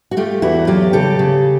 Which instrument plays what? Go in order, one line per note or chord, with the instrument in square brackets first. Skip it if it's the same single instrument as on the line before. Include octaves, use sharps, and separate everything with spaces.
[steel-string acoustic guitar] F#4
A3 F4 G4
E2 E4 F#4
F#3 F4 G4
C#3 G4 A4
C#3